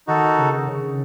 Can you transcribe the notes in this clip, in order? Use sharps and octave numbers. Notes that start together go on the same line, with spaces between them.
D#3 D#4 F#4 A4
C#3
C#3